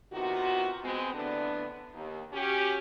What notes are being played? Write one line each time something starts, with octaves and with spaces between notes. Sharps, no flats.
C3 D#3 B3 F4 F#4
G#3 B3 C4
A2 D3 B3 D4
D#2
C#4 F#4 G4